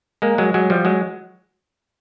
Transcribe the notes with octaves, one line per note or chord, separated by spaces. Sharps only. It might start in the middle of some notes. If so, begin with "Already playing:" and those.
G#3 A#3
F#3 G#3
F#3 G#3
F3 G3
F#3 G#3